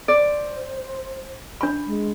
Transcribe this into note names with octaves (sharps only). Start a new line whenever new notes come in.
C5 D5
D4 B5
G#3